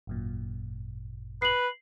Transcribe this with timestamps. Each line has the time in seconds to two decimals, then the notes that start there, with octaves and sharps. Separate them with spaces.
0.07 G#1 F#2 A#2
1.42 B4 C7 F#7